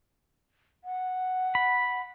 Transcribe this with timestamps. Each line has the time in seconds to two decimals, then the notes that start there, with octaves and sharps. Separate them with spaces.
0.84 F#5
1.55 B5